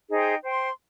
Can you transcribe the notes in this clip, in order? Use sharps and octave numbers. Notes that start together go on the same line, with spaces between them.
D#4 G#4 C5 G5
C5 G5 C6